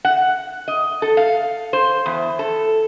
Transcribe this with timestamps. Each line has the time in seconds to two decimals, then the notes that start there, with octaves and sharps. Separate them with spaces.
0.05 F#5
0.68 D#5
1.02 A4
1.17 F5
1.73 C5
2.06 E2
2.39 A4